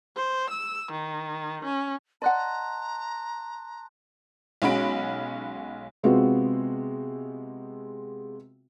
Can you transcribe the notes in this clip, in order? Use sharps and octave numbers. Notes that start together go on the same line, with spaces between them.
C5
E6
D#3
C#4
D5 D#5 F#5 A5 A#5 C6 F#6
B1 G#3 C#4 F#4 B5 D7
C3 G#3 B3 C4 F4 F#4